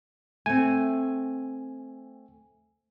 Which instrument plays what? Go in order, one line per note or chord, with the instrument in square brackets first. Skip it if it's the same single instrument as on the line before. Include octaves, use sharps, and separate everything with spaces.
[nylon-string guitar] A3 C4 [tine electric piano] G#5